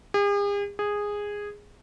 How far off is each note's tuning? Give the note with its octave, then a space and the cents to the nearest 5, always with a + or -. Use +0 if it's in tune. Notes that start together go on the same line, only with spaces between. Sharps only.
G#4 -45
G#4 -10